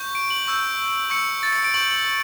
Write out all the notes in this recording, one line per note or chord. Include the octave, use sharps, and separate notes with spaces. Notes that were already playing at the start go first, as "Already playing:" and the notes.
Already playing: C#6 G6
D7
F#7
C#6 E6 G6
C#6 E6 G6 C#7
A6
C#7
D7
C#6 G6 F#7
F#7